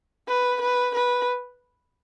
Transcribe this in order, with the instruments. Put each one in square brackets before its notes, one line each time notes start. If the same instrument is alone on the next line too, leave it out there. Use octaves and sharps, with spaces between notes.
[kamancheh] B4
B4
B4